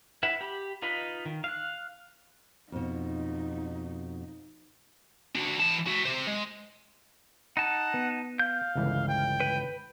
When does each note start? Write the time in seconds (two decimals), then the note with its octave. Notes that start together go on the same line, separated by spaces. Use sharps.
0.23 E4 B4 E5 F#5
0.41 G4 B5
0.82 D#4 F4 B4 D#5 B5
1.25 D#3
1.44 F5 F#6
2.72 F2 B2 D#4
5.35 D4 F#4
5.59 E3 A5
5.86 F#4 E5
6.05 G4 C5
6.27 G#3
7.57 D#4 F#5 A5
7.94 B3
8.39 F5 G6
8.75 G1 C#2 E3
9.08 G5
9.40 B4